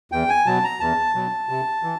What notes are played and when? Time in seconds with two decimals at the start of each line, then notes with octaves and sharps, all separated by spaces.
0.12 E2 G5
0.29 G#5
0.46 B2 F#3 A5
0.64 A#5
0.80 E2 A5
1.15 B2 F#3
1.49 C3
1.83 E3